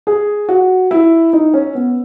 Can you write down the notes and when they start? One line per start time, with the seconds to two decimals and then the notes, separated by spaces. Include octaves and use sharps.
0.07 G#4
0.49 F#4
0.91 E4
1.33 D#4
1.54 C#4
1.75 B3